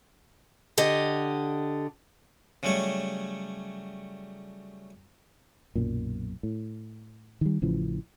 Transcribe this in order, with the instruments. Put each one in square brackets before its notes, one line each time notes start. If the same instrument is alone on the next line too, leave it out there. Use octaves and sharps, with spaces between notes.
[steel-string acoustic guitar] D3 G4 D#5
[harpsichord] C#3 F#3 G3 A3 C#5
[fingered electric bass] B1 F#2 A#2
A2
D#3 G3
A1 C#3 E3 F3